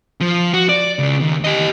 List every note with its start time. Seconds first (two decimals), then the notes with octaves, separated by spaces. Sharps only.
0.21 F3
0.54 F#4
0.69 D5
0.99 C#2 C#3
1.21 D#2
1.44 G4 D#5